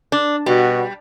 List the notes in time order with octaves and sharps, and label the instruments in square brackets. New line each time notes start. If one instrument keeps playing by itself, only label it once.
[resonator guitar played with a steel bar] D4
[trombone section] B2 F#4 [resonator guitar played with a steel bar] G3